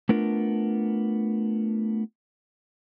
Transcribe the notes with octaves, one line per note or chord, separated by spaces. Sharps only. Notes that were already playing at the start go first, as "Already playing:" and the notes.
A3 B3 D4 F4 A#4